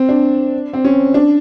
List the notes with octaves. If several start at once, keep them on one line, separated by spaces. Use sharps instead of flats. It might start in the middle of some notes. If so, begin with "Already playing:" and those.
Already playing: C4
D4
C4
C#4
D4